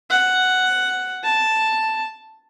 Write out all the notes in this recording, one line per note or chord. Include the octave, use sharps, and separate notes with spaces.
F#5
A5